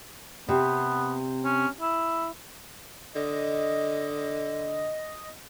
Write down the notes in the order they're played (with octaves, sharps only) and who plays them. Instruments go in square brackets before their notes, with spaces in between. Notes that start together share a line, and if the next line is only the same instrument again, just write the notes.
[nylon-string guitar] C3 [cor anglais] B3
[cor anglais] C#4
E4
[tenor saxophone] D3 [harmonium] D#5